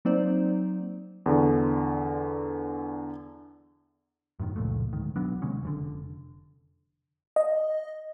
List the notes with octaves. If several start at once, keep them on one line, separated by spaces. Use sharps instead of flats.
F#3 A#3 C4 D#4 C5 D5
E2 D3
F#2 A2 D3 D#3
C#2 A#2 F3 A3
D2 G#2 D#3
B1 F#3 B3 D4
C3 D#3 G#3 C#4
F1 B2 D3
D#5